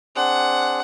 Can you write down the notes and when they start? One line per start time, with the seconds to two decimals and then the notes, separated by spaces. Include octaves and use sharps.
0.16 C4 D4 G#4 F#5